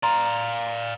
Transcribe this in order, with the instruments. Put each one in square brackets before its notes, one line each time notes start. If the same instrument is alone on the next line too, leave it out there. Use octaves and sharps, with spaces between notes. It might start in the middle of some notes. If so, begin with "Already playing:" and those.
[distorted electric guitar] D5 F5 [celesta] A#5 C6